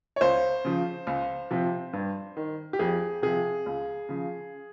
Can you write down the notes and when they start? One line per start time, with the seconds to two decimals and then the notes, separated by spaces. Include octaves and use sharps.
0.16 C#5
0.21 C#2 C5
0.65 C#3 F3
1.07 C#2
1.51 C3 F3
1.93 G2
2.37 D#3
2.73 G4
2.79 F2 G#4
3.22 C3 F3 G#4
3.66 C#2
4.09 C#3 F3